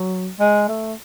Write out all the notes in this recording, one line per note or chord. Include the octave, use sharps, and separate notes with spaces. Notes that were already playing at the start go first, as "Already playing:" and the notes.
Already playing: F#3
G#3
A3